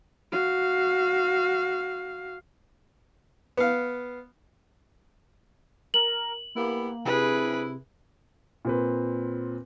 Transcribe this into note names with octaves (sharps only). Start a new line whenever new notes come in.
F#4 F5
B3 F5
A#4 F#7
A#3 B3 E4 G4
C3 D4 E4 G#4 B4
A#2 C4 B4